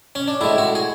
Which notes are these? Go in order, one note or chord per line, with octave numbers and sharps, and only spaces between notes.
C#4
D4
A2 G#3 E4
F#4
G#4